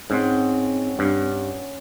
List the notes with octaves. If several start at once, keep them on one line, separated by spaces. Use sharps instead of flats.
G#2 C4 C#4 F#5 C6
G2